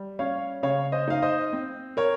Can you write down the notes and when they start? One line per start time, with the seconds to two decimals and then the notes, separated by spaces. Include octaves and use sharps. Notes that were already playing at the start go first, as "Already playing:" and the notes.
Already playing: G3
0.19 C#4 C#5 F5
0.63 C#3 C#5 F5
0.92 C5 D#5
1.08 D#4 F5
1.22 C5 D#5
1.53 C4
1.97 A#4 C#5